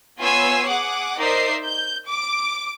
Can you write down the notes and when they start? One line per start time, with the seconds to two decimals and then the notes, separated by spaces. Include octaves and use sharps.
0.20 B3 F4 C#5 G#5 E6 C7
0.67 G#4 F#5 D6
1.18 D#4 A#4 C5 D5 E5 C7
1.65 G6
2.07 D6 D7